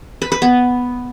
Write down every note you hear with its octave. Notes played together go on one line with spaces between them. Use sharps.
B4
B4
B3